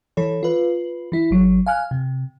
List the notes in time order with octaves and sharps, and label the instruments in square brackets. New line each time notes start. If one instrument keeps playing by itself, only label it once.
[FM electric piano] E3 A4 C#5
F4 B4
E3 E4
G#1 F#3
F5 G#5 F6 F#6
C3